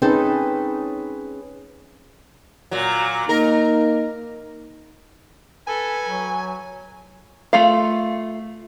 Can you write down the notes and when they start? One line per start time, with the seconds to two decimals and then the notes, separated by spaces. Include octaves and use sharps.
0.02 C4 C#4 D#4 G#4 A4 B4
2.71 A#2 F#3
3.29 A#3 D#4 A#4
5.67 A4 B4 G#5
6.04 F#3
7.53 A3 F4 F5